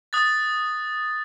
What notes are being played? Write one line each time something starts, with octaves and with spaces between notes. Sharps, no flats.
D#6 F#6 A6